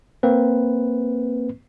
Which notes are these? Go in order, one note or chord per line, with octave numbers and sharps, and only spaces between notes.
A#3 C4 B4